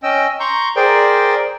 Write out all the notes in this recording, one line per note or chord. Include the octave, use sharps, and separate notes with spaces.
C#4 D#5 G5 E6
A#5 C6 C#6 G6
G#4 A#4 C5 D5 G5